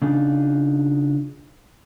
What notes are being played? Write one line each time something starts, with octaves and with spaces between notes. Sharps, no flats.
C#3 D4 D#4 F4 G#4